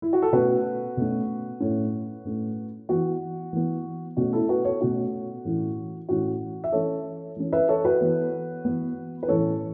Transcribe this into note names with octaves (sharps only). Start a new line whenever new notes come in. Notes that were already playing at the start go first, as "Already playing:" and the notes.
E4
F#4
A4
B2 A3 C#4 F#4 B4
B2 A3 C#4
A2 A3 C#4
A2 A3 C#4
E3 B3 F#4
E3 B3
B2 A3 C#4 F#4
E4 A4
F#4 B4
A4 C#5
B2 A3 C#4 F#4
A2 E3 C#4
A2 E3 C#4 F#4
E5
E3 C#4 A4 C#5
E3 C#4
B4 E5
A4 C#5
F#4 B4
E3 B3
E3 B3
B4
A2 E3 C#4 A4 C#5